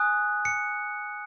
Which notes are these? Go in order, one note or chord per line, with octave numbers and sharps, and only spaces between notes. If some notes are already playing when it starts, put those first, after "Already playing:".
Already playing: G#5 D#6 F#6
C#7